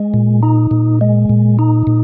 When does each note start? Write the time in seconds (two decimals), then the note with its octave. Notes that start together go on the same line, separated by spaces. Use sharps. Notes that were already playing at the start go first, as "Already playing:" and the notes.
Already playing: G#3
0.14 A#2
0.43 D#4
0.71 A#2
1.01 G#3
1.29 A#2
1.59 D#4
1.87 A#2